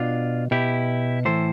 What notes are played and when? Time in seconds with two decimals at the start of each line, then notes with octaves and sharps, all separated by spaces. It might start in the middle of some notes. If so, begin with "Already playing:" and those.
Already playing: B2 D4 F4
0.51 B2 E4 G4
1.25 A2 E3 A4 C5